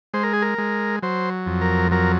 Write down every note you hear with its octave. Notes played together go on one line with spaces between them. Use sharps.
G#3 C5
A#4
G#4
A#4
G#3
F#3 C5
F2
A#4
F#3 A#4